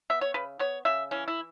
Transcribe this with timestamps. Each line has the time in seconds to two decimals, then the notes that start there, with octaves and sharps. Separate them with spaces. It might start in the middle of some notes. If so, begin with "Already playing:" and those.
0.10 B3 E5
0.21 C#5
0.34 C#3 B4
0.59 B3 C#5
0.85 C#3 E5
1.11 E3 C#4
1.28 E4